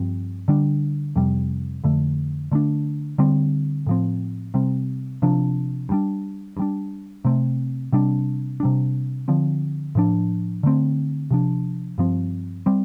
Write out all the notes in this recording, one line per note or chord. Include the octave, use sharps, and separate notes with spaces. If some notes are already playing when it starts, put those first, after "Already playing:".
Already playing: G2 F3 C4
D3 G3 D4
F2 C3 G3
F2 D3 A3
D3 A3 D4
D3 G3 C4
A2 F3 C4
C3 G3 C4
C3 F3 D4
G2
G3 D4
G2
G3 D4
C3 A3 C4
C3 G3 D4
C3 G3 D4
D3 F3 C4
A2 F3 D4
D3 A3 C4
C3 F3 D4
G2 F3 C4
G3 C4